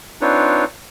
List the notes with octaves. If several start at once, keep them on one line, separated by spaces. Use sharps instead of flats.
C4 D4 D#4 F4 B4 C#5